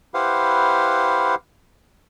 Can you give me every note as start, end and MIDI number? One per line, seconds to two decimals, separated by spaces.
0.14 1.35 64
0.14 1.35 67
0.14 1.35 71
0.14 1.35 72
0.14 1.35 77
0.14 1.35 78